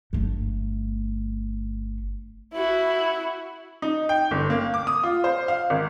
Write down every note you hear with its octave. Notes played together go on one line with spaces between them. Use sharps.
G1 A3
E4 F#4
D#4
G5
G1
A#3
D6
D#6
F4
C5
F5
G#1